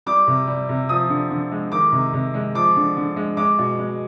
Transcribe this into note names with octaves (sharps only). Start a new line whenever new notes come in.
G3 D6
C3
G3
C3
F3 D#6
D3
D3
G#3
D#3 D6
C3
C3
G#3
F3 D6
D3
D3
G#3
G#3 D6
B2
G#3